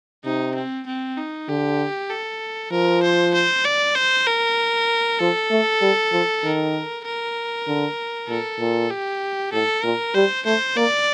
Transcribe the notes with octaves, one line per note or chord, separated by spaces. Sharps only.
C3 D#4
C4
C4
D#4
D3 G4
A4
F3 A#4
C5
C5
D5
C5
A#4
F3 A4
A3
G3
F3
D#3 A#4
A#4
D3
A#2 A4
A#2
G4
A2 A4
A#2 A#4
G3 C5
A3 C5
A#3 D5